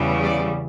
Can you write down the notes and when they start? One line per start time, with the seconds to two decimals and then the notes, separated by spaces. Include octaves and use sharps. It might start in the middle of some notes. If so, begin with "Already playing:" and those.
Already playing: E2 C#3 G3
0.22 D5